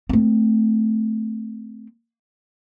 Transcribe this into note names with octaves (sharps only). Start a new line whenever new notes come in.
A3 C4